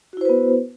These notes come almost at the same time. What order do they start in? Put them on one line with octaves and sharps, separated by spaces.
F#4 E4 C5 B4 B3